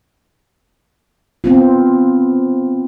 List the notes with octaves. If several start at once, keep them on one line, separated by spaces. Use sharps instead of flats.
B3 C4 F4